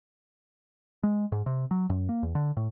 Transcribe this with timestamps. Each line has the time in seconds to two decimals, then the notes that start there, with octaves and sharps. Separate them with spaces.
1.03 G#3
1.32 G#2
1.46 C3
1.71 F#3
1.90 F#2
2.09 A#3
2.23 E2
2.35 D3
2.57 A2